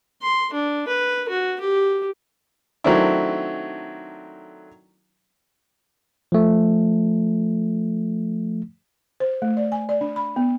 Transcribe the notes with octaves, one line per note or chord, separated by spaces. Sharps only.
C6
D4
B4
F#4
G4
D#3 F#3 A3 C4 D4 E4
F3 A3
C5
A3
D5
G#5
D5
D4
B5
B3